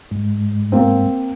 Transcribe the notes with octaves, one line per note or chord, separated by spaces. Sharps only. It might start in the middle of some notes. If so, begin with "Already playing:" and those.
G#2
A#3 C4